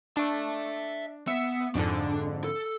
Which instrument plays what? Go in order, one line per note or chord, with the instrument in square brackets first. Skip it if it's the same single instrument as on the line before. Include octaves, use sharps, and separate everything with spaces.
[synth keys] D4 [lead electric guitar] E5 A5
[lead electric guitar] B3 [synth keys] E5 C#7
[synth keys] F2 G#2 D3 [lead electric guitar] D4
[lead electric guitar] A4